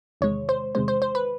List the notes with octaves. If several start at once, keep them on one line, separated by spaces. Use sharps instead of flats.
E2 C3 D#3 G#3 C#5
C5
E2 C3 D#3 G#3 C5
C5
C5
B4